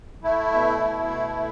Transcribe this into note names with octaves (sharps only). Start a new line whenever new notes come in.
A3 E4
B2
B2
A3
A3